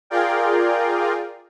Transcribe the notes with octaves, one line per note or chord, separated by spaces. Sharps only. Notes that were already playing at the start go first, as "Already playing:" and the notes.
F4 G#4 A#4 D5 F5 G5